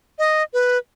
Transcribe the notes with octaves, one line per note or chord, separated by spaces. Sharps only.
D#5
B4